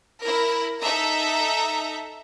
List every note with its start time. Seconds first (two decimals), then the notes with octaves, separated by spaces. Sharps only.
0.21 E4 A#4
0.81 D#4 A4 E5 A#5